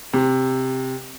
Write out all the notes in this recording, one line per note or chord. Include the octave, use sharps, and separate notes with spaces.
C3